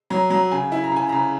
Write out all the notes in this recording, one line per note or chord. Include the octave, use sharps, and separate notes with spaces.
F#3 A#5
F#3 A#5
C#3 G#5
E4
A#5
C#3 G#5
C#3 A#5